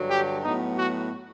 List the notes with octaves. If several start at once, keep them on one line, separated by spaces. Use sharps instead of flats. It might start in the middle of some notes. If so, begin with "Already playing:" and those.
Already playing: G2 D3 F#3
G4
A2 F#3 B3 D#4
F#4